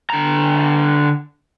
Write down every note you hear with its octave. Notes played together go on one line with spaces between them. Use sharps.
D3 A#5